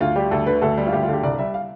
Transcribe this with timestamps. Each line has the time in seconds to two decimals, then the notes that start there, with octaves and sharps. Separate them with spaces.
0.01 D2 F4
0.16 G3 G4
0.31 D2 A4
0.46 D3 B4
0.62 D2 A4
0.77 G3
0.87 F4
0.92 D2 G4
1.03 F4
1.08 D3
1.13 G4
1.23 C2 D5
1.38 G3 E5
1.54 F5